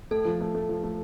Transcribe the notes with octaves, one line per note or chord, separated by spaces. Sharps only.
A3 A4
F3
A3
A3
F3
A3